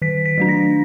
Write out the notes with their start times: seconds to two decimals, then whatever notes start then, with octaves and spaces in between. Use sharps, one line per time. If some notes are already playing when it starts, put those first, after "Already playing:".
0.02 D#3 B6
0.26 B6
0.38 F#3 A3 D4
0.49 A#6